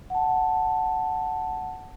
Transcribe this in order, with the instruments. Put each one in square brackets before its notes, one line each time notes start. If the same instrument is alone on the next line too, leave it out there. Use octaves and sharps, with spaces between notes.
[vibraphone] F#5 A5